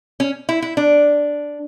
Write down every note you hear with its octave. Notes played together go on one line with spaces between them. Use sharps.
C#4
E4
E4
D4